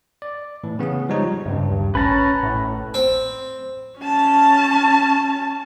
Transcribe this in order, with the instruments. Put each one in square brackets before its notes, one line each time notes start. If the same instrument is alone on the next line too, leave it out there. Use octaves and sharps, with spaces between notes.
[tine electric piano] D5
A2 E3
C#3 B3 C#4 G#4
F3 G3 G#3 D#4 C#5
[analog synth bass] G2 [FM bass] C#3
[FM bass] D#2
[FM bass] A1 [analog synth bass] C#4 [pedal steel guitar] B4 A5 A#5
[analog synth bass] A2
[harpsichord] C4
[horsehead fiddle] C#4 A5